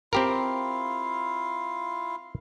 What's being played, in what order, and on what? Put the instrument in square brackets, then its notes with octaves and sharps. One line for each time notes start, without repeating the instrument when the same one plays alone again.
[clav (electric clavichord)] C4 G4 A#4 [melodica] E4 F4 F5